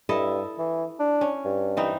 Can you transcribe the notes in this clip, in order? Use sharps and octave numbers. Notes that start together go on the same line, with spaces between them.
G2 E4 A4 D#5
E3
D4
C#4
G2
E3 C4 D#4